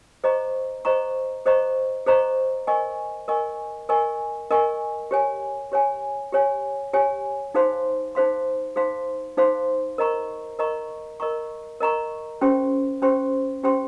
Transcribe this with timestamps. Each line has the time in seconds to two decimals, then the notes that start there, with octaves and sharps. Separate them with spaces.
0.24 G#4 C5 D#5 A#5 C#6
0.85 G#4 C5 D#5 A#5 C#6
1.46 G#4 C5 D#5 A#5 C#6
2.06 G#4 C5 D#5 A#5 C#6
2.67 A#4 D#5 G#5 C#6
3.28 A#4 D#5 G#5 C#6
3.89 A#4 D#5 G#5 C#6
4.51 A#4 D#5 G#5 C#6
5.11 G4 C#5 G#5
5.72 G4 C#5 G#5
6.33 G4 C#5 G#5
6.93 G4 C#5 G#5
7.54 D#4 G#4 C5 F5 C6
8.15 D#4 G#4 C5 F5 C6
8.76 D#4 G#4 C5 F5 C6
9.37 D#4 G#4 C5 F5 C6
9.98 A#4 D#5 A#5 C#6
10.59 A#4 D#5 A#5 C#6
11.20 A#4 D#5 A#5 C#6
11.80 A#4 D#5 A#5 C#6
12.41 C#4 G4 C5 G5 C6
13.02 C#4 G4 C5 G5 C6
13.64 C#4 G4 C5 G5 C6